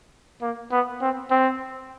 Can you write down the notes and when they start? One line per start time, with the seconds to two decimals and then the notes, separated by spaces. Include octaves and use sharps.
0.42 A#3
0.71 B3
1.01 C4
1.31 C4